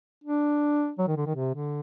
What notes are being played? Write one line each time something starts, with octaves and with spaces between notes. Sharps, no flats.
D4
F#3
D#3
D3
D#3
C3
D3